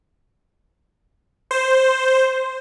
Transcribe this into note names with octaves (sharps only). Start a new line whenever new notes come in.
C5